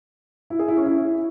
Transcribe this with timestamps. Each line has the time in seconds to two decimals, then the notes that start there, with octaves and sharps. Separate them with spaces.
0.50 E4
0.59 G#4
0.68 E4
0.77 C#4
0.86 E4